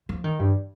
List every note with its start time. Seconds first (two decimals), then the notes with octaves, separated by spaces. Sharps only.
0.09 F3
0.24 D#3
0.39 G2